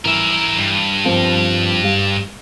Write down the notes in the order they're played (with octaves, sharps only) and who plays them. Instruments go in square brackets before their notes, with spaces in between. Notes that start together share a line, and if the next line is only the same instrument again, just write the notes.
[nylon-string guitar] E3 [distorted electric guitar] A#4 E5
[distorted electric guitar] G2
[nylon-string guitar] F3 A#3 C4
G3 F5